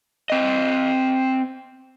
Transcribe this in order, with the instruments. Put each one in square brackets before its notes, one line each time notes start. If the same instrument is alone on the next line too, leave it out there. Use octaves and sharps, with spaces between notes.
[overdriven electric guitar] C4 D#5